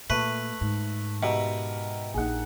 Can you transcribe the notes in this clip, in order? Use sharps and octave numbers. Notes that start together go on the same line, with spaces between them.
A#2 A3 B4
G#2
B2 G4 A#4 E5
A#1 D#4 G#4 F#5